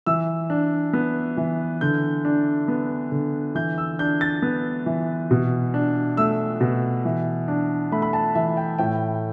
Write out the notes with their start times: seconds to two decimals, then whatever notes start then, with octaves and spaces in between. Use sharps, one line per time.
0.06 E3 E6
0.50 D4
0.93 B3
1.37 E3
1.81 D3 G6
2.25 D4
2.68 B3
3.12 D3
3.55 E3 G6
3.78 E6
3.99 D4 G6
4.21 A6
4.42 B3
4.86 E3
5.31 B2
5.74 D4
6.17 A3 E6
6.61 B2
7.05 E3
7.48 D4
7.92 A3 B5
8.02 B5
8.13 A5
8.35 E3 E5
8.57 G5
8.79 A2 G5